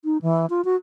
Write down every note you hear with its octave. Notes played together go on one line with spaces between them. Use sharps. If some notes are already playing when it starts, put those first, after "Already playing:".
D#4
E3
F4
F#4